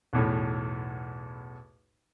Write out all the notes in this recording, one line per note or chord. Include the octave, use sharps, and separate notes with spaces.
B1 E2 A2